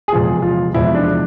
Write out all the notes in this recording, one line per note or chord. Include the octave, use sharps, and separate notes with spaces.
G#4
E2 C3 F3 G#3 F4
F4
E2 C3 F3 G#3 E4
D4